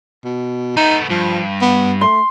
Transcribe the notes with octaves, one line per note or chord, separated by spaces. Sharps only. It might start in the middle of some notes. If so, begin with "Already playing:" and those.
B2
A3 B3 D#4
G2 F3
B3
A3 C6